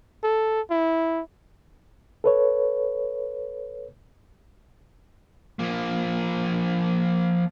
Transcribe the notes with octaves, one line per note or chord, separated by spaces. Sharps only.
A4
E4
A4 B4 C#5
F3 A#3